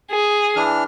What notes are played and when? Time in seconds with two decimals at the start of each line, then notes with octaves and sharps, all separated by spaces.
0.11 G#4
0.56 E3 D4 F6